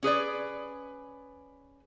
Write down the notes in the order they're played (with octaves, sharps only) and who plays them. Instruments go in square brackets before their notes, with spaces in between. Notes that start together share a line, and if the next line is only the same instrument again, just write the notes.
[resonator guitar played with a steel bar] C#4 G#4 B4 D5